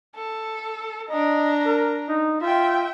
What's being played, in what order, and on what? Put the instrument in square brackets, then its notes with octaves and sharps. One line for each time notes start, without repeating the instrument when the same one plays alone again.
[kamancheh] A4
[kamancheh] D4 A#5 [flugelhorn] D#5
[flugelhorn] A#4
D#4
[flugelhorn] F4 [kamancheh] E5 G5